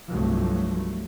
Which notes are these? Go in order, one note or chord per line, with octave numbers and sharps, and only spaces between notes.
C2 G2 F3 F#3 A3